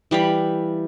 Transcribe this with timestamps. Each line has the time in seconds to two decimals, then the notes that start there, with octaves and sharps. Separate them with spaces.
0.11 E3 G3 F5 B5